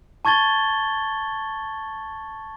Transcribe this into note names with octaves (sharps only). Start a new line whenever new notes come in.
A5 C#6 G#6 A6 G7